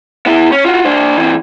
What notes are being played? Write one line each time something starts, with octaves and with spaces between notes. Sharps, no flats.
B3 E4
C#4
F4 F#4
D4 C5
E3 C4